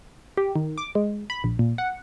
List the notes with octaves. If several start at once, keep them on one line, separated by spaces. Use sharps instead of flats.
G4
D#3
D6
G#3
B5
A#1
A#2
F#5